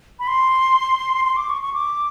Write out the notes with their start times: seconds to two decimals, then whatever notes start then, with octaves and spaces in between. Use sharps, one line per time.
0.19 B5
0.27 C6
1.25 C6
1.37 D6
1.49 C#6
1.62 C#6
1.73 D6